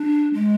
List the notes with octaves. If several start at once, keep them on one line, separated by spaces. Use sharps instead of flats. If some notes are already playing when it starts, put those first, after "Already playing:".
Already playing: D4
G#3